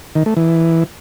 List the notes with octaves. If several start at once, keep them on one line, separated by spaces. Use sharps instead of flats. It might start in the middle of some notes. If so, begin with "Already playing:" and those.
D#3
A3
E3